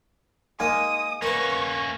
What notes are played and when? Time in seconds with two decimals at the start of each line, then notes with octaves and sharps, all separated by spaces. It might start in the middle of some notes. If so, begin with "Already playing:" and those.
0.60 G#3 A#3 D#4 D#5 F5 G#5 D#6
1.22 A#3 C#4 A#4 B4 C#6